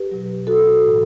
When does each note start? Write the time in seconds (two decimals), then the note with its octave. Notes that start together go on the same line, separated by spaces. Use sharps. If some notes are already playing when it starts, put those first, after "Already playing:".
Already playing: G4 B4
0.11 B2 F#3
0.47 F#4 A4
0.83 A2 E3